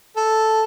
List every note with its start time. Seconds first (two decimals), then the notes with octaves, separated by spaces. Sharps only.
0.17 A4